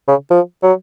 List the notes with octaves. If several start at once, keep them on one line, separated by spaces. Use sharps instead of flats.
C#3
F3
F#3